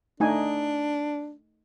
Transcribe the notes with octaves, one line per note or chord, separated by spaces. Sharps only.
A3 D4 D#4 G#5